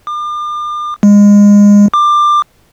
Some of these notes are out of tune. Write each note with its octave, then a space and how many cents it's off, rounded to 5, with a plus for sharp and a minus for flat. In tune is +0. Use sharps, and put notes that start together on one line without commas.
D6 +40
G#3 -25
D6 +20